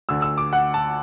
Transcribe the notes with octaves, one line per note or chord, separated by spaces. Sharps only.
D2 D3 E6
E6
D6
F#5
A5